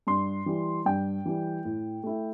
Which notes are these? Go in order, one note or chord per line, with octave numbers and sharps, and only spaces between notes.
G2 C6
E3 G3
G2 G5
E3 G3
A2
A3 E4